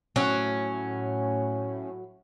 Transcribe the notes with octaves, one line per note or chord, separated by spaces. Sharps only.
A2 F#3 C#4